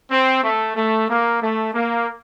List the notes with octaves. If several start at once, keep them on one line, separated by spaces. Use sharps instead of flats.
C4
A3
A3
A#3
A3
A#3